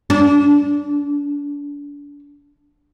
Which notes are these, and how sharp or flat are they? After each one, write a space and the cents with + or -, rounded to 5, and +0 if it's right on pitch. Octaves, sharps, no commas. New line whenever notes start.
D4 -30